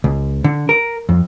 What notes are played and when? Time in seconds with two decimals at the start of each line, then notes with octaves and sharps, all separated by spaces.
0.04 C#2
0.44 D3
0.69 A#4
1.09 F2